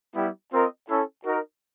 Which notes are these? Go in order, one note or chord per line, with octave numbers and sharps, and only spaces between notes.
G3 B3 E4 G4
C4 F4 A#4 D#5
C#4 E4 A4
D#4 F#4 A#4